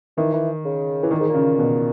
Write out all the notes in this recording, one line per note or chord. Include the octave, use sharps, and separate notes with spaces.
D#3 E3
E3
C#3
E3
A#2 D#3
G#2
A#2
C#3
B2